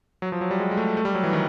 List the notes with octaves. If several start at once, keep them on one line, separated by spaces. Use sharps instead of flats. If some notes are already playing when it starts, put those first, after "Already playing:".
F#3
F3
F#3
G3
G#3
G#3
A3
A3
G3
F#3
E3
D#3